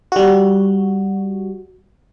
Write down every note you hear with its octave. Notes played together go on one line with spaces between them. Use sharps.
G3 F#4